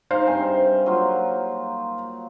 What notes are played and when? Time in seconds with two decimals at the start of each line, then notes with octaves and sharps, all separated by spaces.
0.11 D#4 C5 F5
0.26 G2 C3 G#5
0.86 F#3 A#3 F4